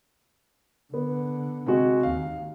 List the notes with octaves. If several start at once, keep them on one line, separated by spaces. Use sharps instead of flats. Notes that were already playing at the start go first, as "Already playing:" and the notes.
D3 B3
C3 G#3 F#4
D#2 F5